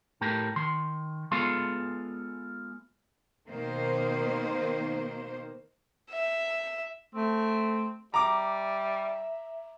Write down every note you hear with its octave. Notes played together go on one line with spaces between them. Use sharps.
A2 A3 G4 A#4
D#3 C6
G#3 B3 F4 A4 F5 C6
B2 D#3 A#3 C5
E5
A3 C4
G3 E5 A#5 D6